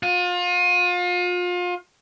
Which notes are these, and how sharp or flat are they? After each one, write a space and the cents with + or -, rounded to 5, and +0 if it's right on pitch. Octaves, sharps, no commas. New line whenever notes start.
F4 +35